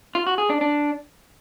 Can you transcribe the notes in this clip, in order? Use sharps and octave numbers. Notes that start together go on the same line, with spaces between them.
F4
F#4
G#4
D4
D4